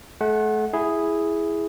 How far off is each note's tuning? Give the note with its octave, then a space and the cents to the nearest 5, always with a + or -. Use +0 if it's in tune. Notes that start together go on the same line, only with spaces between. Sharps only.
A3 -35 F#5 +0
E4 +0 G#4 +0